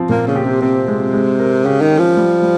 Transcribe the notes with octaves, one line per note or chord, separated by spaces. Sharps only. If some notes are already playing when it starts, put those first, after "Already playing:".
Already playing: F3 C4
A#2 A#3
C#3
G4
C3
C3 C4
G#3
G#3
A#4
C#3 G4
D#3
C#4
F3
G3
G3